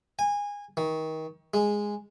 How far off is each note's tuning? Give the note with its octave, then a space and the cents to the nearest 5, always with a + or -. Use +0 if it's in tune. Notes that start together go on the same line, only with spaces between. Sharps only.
G#5 -20
D#3 +30
G#3 -5